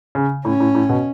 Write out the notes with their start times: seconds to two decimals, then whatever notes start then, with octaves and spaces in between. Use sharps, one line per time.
0.15 C#3
0.45 A2 C#4
0.60 A2
0.75 A2
0.89 B2